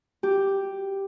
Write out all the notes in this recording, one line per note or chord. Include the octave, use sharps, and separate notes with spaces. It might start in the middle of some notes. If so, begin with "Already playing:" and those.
G4